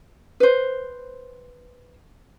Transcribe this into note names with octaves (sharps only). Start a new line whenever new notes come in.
B4 C5